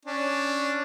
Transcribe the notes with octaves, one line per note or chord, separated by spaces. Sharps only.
C#4 D4